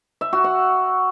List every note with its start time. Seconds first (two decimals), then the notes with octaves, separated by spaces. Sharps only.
0.21 E5
0.33 F#4
0.44 F#5